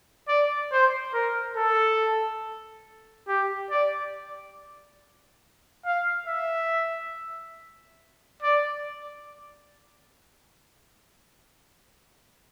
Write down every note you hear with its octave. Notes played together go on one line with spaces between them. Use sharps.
D5
C5
A#4
A4
G4
D5
F5
E5
D5